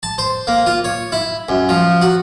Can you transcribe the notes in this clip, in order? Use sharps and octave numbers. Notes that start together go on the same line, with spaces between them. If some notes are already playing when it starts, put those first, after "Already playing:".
A5
C5
A#3
F4
C#5
E4
F#2
F3
F#4